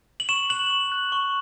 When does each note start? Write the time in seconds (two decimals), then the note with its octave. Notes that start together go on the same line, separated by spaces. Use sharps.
0.20 F#7
0.29 C#6 E7
0.50 F#6 F#7
0.70 C#6
0.92 F#6
1.12 C#6